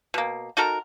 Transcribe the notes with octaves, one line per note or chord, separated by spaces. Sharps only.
B2 A#3
D#4 F#4 A4 A#4